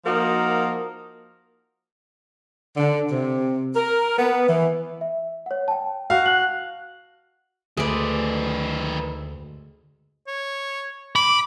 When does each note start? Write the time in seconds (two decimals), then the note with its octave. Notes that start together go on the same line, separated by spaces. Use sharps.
0.06 F3 A#3 D#4 F#4 A#4
2.76 D3
3.11 C3
3.76 A#4
4.18 B3
4.47 E3
5.01 E5
5.46 C#5 F#5
5.68 G5 A5
6.10 F#4 F5
6.26 F#6 F#7
7.77 D2 D#3 G#3 B4 D5
10.28 C#5
11.16 B5 D6